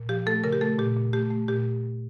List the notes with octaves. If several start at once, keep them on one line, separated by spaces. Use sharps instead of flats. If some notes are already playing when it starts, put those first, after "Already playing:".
Already playing: A#2
F3 G4
A3 A4
C#3 A#4
G4
A3 A4
A#2 G4
A#2
A3 G4
A3
A#2 G4